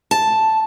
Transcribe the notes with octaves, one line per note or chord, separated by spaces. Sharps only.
A5